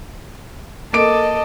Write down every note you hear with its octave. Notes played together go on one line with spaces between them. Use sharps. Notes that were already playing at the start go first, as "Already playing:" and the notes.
A#3 A4 D#5 D6 D7